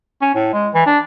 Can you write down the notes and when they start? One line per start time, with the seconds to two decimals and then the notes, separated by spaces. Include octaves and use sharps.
0.21 C#4
0.34 A2
0.53 G#3
0.74 E3
0.86 D4